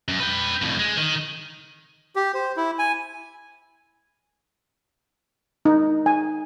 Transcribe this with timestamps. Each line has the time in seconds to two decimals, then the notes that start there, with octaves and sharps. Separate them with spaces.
0.08 F#2
0.20 B4 G5
0.62 F2 A2
0.79 G#3
0.97 D#3
2.16 G4
2.34 C5
2.57 E4
2.79 G#5
5.65 D#4
6.06 G#5